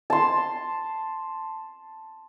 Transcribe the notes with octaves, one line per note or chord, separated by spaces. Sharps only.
A5 C6